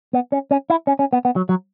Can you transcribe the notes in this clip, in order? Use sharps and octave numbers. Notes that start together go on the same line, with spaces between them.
B3
C#4
C#4
E4
C#4
C#4
B3
B3
F#3
F#3